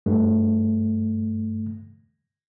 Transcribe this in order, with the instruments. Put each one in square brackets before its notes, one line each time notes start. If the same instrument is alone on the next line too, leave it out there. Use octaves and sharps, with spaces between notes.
[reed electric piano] G2 A3